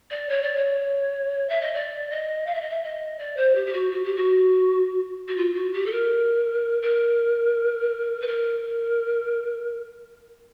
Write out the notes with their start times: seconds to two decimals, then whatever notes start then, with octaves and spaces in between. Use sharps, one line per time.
0.10 D5
0.29 C#5
0.42 D5
0.56 C#5
1.49 E5
1.61 D#5
1.74 D5
2.10 D#5
2.46 F5
2.54 E5
2.61 D#5
2.69 E5
2.83 D#5
3.19 D5
3.36 C5
3.55 G4
3.66 G4
3.73 F#4
3.91 F#4
4.04 G4
4.16 F#4
5.28 F#4
5.37 F4
5.54 F#4
5.73 G4
5.86 A4
5.92 A#4
6.82 A#4
8.21 B4
8.27 A#4